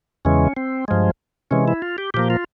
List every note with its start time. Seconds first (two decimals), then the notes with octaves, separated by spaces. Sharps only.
0.25 E2 C#3 E3 G#3 C#4
0.57 C4
0.88 G2 F3 G#3
1.51 C3 E3 G#3 C#4
1.68 E4
1.82 F4
1.98 G4
2.14 A#2 F3 A#3 G4
2.30 F4